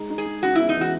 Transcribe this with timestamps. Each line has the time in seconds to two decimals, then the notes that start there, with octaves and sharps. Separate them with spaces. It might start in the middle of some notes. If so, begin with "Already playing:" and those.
Already playing: G#3 D#4
0.10 D#4
0.18 G#4
0.26 G#3
0.43 C#3 F#4
0.55 E2 E4
0.69 D#4
0.77 E3 F#4